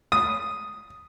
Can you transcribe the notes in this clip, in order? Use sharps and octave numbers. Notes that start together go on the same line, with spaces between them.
D#6